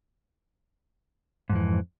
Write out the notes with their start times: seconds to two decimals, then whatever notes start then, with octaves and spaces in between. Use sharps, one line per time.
1.49 G#2
1.52 F2
1.55 E3